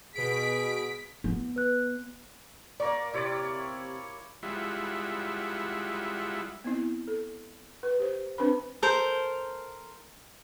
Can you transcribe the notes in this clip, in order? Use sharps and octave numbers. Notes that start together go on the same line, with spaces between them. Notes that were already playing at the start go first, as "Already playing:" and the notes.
B2 G#4 B6 D7
B3
B4 F#6
A#3 A#4 D5 C#6
C3 E4 C#5 D5
G3 G#3 E4 F4 E5 F#5
B3 C4 E4
A4
B4
G4 C5
C4 D4 B4 C5 B5
A4 A#4 C5